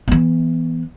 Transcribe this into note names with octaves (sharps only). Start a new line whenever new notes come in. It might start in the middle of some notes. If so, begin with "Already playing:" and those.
E3 B3